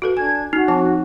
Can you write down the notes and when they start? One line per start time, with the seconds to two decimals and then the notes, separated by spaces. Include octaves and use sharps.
0.02 F#4 A4 B4
0.17 D4 G#5 G#6
0.53 D#4 F#4
0.68 F3 C4 A5